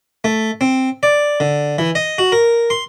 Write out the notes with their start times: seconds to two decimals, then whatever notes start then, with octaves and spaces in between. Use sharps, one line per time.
0.24 A3
0.61 C4
1.03 D5
1.40 D3
1.78 E3
1.95 D#5
2.18 F#4
2.32 A#4
2.70 C6